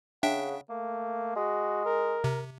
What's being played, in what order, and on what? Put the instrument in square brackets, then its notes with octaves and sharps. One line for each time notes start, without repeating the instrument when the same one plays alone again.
[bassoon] C#3 [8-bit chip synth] D4 E5 G5 [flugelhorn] F#5
[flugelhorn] A3 [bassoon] A#3
[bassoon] G#3 [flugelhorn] F#4
[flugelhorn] A#4
[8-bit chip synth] C3